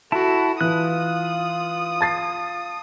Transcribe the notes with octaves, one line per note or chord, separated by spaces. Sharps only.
E4 F#4 A4 A5
E3 F4 D#6 F#6
A5 A6 C7